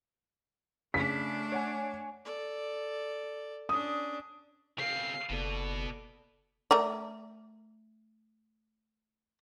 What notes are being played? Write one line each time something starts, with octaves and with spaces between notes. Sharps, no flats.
C#3 A3 D4 B6
C#5 F#5 G#5
A4 D5
C#4 D4 D#6
C#3 C4 F5 C7
F#1 B2 B3 A4 D5
A3 A#4 D5